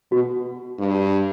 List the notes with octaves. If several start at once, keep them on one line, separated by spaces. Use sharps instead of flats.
B2 F#4
G2